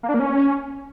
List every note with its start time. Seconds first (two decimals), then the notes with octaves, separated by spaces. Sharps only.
0.03 A#3
0.09 D4
0.14 A#3
0.20 C#4